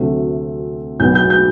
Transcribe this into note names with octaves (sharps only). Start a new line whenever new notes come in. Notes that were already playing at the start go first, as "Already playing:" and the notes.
Already playing: D2 C3 F#3 A3
B1 B2 F#3 B3 G6
G6
G6